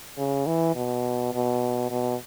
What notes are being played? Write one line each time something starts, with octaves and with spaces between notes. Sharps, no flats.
C#3
E3
B2
B2
B2